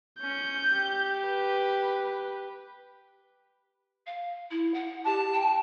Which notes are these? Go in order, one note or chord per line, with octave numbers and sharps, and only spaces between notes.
C#4 G6
G4
B4
F5
E4
F#5
G4 A5
G5